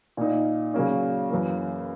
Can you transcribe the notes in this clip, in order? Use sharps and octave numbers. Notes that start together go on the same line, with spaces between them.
A#2 A#3 D#4
C#3 F#3 A#3 C#4
F#2 E3 A#3